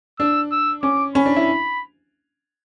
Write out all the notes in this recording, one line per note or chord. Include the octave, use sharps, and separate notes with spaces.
D4 E6
E6
C#4 D6
C#4 B5
D4
E4